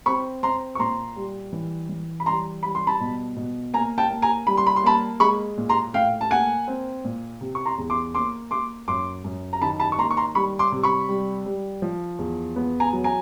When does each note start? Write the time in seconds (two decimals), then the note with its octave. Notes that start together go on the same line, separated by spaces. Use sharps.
0.06 C4 B5 C#6
0.43 C4 A#5 C6
0.75 C#6
0.79 A#2 A#5 C6
1.16 G3
1.53 E3
1.89 E3
2.20 B5
2.26 G3 A#5 C6
2.63 G3 B5
2.75 C6
2.87 A5 B5
3.00 B2
3.36 B2
3.74 A#3 G#5 A#5
3.98 G5 A5
4.10 A#3
4.22 G#5 A#5
4.47 G3 B5
4.57 C6
4.67 B5
4.76 C6
4.84 A#3 A5 B5
5.20 G#3 B5 C#6
5.57 A#2
5.69 A#5 C6
5.94 A2 F5 G5
6.21 A5
6.31 A#3 F#5 G#5
6.68 C4
7.04 A#2
7.41 C3
7.55 C#6
7.65 A#5 C6
7.78 E2
7.90 C6 D6
8.15 A#3 C6 D6
8.51 A#3 C6 D6
8.88 F#2 C6 D6
9.24 F#2
9.53 A#5
9.61 D#3 A5 B5
9.80 A5 B5
9.92 C#6
9.98 A#3 A#5 C6
10.11 C#6
10.17 A#5 C6
10.35 G3 B5 C#6
10.59 C6 D6
10.72 C3
10.83 B5 C#6
11.09 G3
11.46 G3
11.82 F3
12.19 E2
12.56 B3
12.80 G#5 A#5
12.93 F#3
13.04 G#5 A#5